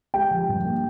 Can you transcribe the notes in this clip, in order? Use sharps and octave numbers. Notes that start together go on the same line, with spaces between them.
G#3 G4 G5
F3
G2
A#3